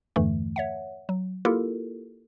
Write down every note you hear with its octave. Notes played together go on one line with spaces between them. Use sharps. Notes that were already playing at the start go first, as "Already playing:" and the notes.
E2 G2 D3 E3 A3
C#5 E5 F#5
F#3
A#3 E4 F4 G4 A4 A#4